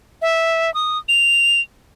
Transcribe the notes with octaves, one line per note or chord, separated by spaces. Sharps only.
E5
D#6
F7